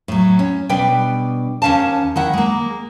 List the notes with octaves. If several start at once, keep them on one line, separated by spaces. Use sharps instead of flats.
A2 F#3
C#4
B2 G3 D4 B4 D5 G5
D#2 F#3 C#4 C5 F5 A5
D#3 E4 F#5
G#3 A#3